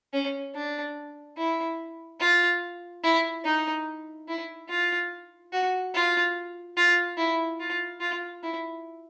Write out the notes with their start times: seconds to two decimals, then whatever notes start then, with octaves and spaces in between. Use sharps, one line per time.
0.14 C#4
0.55 D4
1.38 E4
2.20 F4
3.03 E4
3.45 D#4
4.28 E4
4.69 F4
5.53 F#4
5.94 F4
6.77 F4
7.17 E4
7.60 F4
8.00 F4
8.43 E4